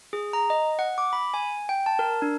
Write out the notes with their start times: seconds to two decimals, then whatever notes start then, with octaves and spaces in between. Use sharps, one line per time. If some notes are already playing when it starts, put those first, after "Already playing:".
0.13 G#4
0.33 A#5
0.50 D#5
0.79 F#5
0.98 D6
1.13 B5
1.34 G#5
1.69 G5
1.86 A5
1.99 A#4
2.22 D4